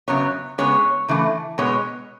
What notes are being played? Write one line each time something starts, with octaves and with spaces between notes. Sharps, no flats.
F#2 C#3 F#3 B3 C#5
C#3 G#3 B3 C#5
C#3 E3 A3
B2 G#3 B3 C#5